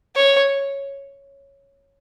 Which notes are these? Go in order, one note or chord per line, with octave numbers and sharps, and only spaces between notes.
C#5